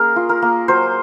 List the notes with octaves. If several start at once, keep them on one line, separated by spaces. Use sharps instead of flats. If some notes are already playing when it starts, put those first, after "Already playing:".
Already playing: A#3 C#4 G#4 A#4
F4
A#4
A#3
F#3 C5